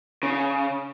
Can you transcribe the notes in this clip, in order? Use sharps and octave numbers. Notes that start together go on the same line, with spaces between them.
C#3